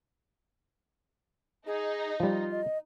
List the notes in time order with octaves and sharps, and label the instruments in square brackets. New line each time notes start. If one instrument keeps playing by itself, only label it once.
[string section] D#4 [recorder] G#4
[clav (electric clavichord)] F3 G3 [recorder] F4
[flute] D#5